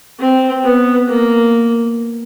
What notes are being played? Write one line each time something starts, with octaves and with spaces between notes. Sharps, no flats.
C4
B3
A#3